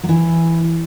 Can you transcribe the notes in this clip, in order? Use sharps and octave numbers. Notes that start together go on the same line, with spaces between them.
F#3
E3